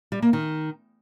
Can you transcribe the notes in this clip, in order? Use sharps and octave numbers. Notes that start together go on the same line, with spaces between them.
G3
A#3
D#3